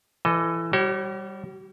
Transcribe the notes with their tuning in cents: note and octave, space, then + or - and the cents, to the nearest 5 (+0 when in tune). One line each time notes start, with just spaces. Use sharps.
E3 +20 A4 +0 D#5 +0
G3 +0 F#4 +45 C#5 -30